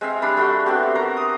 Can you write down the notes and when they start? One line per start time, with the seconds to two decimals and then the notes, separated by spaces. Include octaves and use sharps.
0.01 G#3 C4 E5 F5
0.22 G3 D4 B5
0.37 A3 F#4 C6
0.66 B3 C4 F#4 G4
0.95 A#4 C5 A#5
1.17 D#6